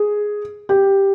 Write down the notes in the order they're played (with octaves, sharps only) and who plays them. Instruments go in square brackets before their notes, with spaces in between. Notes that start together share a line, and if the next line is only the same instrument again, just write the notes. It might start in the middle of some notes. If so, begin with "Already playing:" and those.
Already playing: [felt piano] G#4
G4